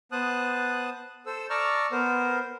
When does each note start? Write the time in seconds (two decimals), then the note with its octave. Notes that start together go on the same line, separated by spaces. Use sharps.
0.12 B3 C5 A5 D#6 F#6
1.26 A4 C5 E6
1.50 D5 A5 A#5 C#6 E6 F6
1.92 B3 A#4 C5